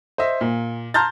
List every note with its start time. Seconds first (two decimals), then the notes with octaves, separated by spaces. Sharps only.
0.18 C5 D#5 E5
0.41 A#2
0.94 A5 A#5 C6 F6 G6 A6